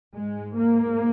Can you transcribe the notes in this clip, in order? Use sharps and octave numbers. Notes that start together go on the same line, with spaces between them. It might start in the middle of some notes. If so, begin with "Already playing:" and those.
G#2 G#3
A#3